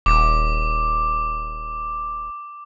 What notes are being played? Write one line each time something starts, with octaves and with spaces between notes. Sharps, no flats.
D#1 D6